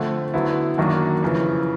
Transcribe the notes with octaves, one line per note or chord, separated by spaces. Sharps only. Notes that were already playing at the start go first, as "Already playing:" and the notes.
Already playing: D3 F3 A3 C4
D3 F#3 B3 E4
F#2 D#3 F#3 A#3 D4
F2 C#3 E3